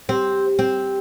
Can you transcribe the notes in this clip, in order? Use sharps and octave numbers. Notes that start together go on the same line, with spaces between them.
C4 G4
C4